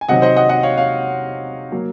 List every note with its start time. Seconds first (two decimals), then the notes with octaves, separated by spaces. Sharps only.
0.01 G#5
0.08 C3 D#3 F#3 C4 D#5 F#5
0.22 C5 D#5
0.36 D#5 F#5
0.49 D#5 F#5
0.63 C#5 F5
0.78 C#5 F5
1.72 F#3 A#3